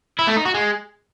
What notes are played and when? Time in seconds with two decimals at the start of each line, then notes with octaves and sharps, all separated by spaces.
0.19 E4
0.28 A3
0.37 D#4
0.45 F#4
0.54 G#3